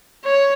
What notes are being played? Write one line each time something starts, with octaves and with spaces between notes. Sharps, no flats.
C#5